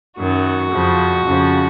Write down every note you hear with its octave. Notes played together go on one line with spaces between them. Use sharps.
F#2 D#3 F#3 F#4
F2 C#3 F3
F2 C#3 F3